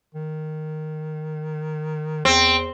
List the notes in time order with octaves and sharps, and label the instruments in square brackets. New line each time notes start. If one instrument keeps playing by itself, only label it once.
[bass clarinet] D#3
[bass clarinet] E2 [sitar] C4